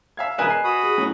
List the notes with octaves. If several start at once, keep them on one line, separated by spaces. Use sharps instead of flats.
E5 F5 G#6
E1 A#4 B4 D#5 G#5 E7
C7
F#4 B5 D#6
G#4
A2 F#3 C#4